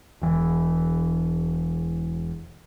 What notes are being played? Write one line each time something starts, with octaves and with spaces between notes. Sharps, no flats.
E1 E3